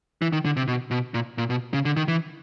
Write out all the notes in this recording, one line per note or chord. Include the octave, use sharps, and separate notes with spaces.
E3
D#3
D3
C3
B2
B2
A#2
A#2
B2
C#3
D3
D#3
E3